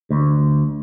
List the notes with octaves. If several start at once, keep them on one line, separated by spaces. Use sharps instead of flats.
D2